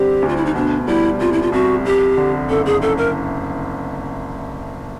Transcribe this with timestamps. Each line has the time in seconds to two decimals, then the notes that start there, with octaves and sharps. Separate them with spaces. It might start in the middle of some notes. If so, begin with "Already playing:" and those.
Already playing: D3 G3 C4 G4
0.22 D2
0.29 F4
0.36 E4
0.45 D#4
0.55 B2 D4
0.87 G3 E4
1.20 C2 F4
1.33 E4
1.42 F4
1.52 C2 F#4
1.85 F2 G4
2.17 D3
2.50 F#1 A4
2.66 G#4
2.82 F#1 A4
2.98 A#4